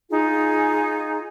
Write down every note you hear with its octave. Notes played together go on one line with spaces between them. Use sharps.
D#4 F4 G#4